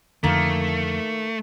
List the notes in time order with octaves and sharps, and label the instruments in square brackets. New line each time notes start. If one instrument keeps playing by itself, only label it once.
[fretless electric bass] F2 D3 [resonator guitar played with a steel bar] D#3 A#3 [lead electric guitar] A3